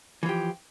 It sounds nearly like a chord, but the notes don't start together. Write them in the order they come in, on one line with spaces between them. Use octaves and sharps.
E3 F3 G4